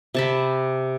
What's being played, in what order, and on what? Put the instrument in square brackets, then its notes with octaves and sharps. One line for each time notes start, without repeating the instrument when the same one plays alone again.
[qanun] C3 A5 B5